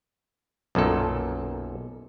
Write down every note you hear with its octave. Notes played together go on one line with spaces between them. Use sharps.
B1 F#2 A#2 A4